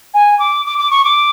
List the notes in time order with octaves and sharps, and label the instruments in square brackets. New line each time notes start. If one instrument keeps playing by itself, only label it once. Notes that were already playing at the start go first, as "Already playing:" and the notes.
[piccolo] G#5
D6
D6
D6
C#6
D6